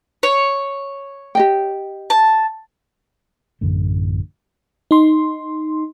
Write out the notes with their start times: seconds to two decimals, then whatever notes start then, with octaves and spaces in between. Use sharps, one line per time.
0.23 C#5
1.35 G4 D#5 G5
2.10 A5
3.61 A1 F#2 D3 A3
4.91 D#4 C6